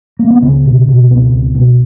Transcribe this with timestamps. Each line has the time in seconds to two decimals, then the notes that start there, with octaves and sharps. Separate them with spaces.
0.19 A#3
0.30 B3
0.42 C#2 C#3 C#4
0.66 B2
0.88 B2
1.10 C#2 B2 B3
1.33 C#2
1.55 B2